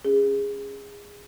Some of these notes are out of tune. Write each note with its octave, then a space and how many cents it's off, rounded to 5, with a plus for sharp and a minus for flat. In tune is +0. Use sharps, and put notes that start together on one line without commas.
C#4 +0 G#4 -20